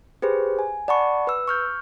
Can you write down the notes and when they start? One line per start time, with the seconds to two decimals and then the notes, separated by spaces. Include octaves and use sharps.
0.22 G4 G#4 B4 C5
0.59 G#5
0.88 D5 F#5 A5 B5 C#6
1.27 B4 E6
1.47 C#6 F6 G6